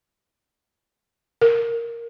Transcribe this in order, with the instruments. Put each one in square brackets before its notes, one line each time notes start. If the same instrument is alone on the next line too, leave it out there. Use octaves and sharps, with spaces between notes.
[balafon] A#4